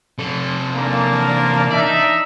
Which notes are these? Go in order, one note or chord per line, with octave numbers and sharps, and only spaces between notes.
C3 A4
E3 A#3 D4 A5
D#4 D5 E5